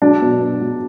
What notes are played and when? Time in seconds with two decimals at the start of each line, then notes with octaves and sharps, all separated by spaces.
0.02 F#3 D4
0.21 B2
0.41 B2
0.61 F#3